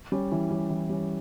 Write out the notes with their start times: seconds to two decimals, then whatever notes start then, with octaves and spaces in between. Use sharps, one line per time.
0.12 G3 C#4
0.32 E3
0.51 G3 C#4
0.70 E3
0.89 G3 C#4